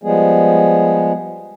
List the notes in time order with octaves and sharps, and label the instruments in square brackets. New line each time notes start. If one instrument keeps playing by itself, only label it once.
[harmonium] F3 G3 G#3 B3 G#4